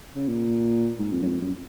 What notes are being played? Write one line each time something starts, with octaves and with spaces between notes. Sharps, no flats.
C#3
A#2
G#2
F2
F#2
F2
F#2